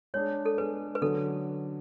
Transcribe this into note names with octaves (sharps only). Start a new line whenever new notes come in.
G#3 D4 G#4 C#5
A4
G#3 D4 G#4 B4
B4
D3 F#3 C#4 A4